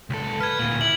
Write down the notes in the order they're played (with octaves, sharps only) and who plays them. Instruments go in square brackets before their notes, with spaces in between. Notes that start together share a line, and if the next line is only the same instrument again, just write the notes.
[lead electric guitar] C#2 A4
[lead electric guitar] B4 [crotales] F6 G#6
[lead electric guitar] D2 A#2
[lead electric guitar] E4 [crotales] F#7